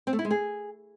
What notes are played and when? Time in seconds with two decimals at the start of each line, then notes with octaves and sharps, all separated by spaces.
0.07 C4
0.13 A3
0.19 E4
0.25 G#3
0.31 G#4